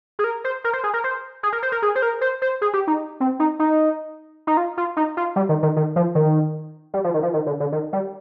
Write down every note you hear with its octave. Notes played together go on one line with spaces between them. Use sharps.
G#4
A#4
C5
A#4
C5
G#4
A#4
C5
G#4
A#4
C5
A#4
G#4
C5
A#4
C5
C5
G#4
G4
D#4
C4
D#4
D#4
D#4
F4
F4
D#4
F4
G3
D#3
D#3
D#3
F3
D#3
G3
F3
D#3
F3
D#3
D3
D3
D#3
G3